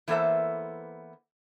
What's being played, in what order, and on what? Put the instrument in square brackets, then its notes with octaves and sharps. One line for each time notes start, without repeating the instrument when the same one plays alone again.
[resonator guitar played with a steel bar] E3 A#3 B3 A4 C5 E5